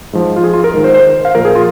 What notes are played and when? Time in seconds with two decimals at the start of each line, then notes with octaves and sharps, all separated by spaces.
0.13 G#2 F3
0.36 F4
0.44 G#4
0.54 F4
0.64 A#4
0.74 G#2 D#3
0.84 C5
0.94 C5
1.25 F5
1.35 A#2 F3 A#4
1.45 G#4
1.55 F4